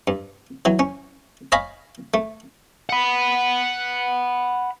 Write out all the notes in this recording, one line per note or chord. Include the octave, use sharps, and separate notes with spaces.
G2
E3 F#3
C#4
C#5 D#5 F5 G#5 A#5 B5
A3
F#5 B5